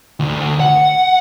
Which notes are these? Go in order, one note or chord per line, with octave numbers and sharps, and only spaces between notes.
D2
F#5